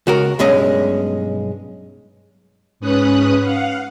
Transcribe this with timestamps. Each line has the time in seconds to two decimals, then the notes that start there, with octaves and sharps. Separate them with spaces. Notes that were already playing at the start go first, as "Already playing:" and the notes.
0.07 C#2 F#4 A#4
0.39 B1 G2 G#3 C#4 D#5
2.80 G#2 C#4 B4 D#6 F#6
3.41 F5 F#5